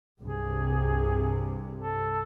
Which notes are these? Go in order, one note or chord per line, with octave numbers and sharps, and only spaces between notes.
C2 G2 C3 G#4
A4